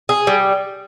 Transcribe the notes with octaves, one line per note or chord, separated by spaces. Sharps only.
G#4
G3